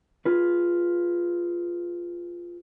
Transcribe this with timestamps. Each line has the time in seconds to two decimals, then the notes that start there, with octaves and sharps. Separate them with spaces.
0.25 F4 G#4 B4